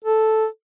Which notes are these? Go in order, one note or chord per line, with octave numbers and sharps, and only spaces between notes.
A4